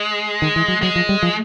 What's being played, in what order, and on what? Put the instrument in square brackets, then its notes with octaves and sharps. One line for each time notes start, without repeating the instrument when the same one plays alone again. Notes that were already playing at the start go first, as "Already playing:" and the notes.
Already playing: [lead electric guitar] G#3
[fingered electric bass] D#3
E3
F#3
[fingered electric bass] F#3 [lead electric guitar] G#3
[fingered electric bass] F3
G3
F3